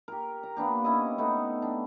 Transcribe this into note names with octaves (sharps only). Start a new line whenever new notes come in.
G4 A#4
A#5
A#3 B3 D4 G4
C#4 E4 D#5
A3 B3 D#4
D4 G4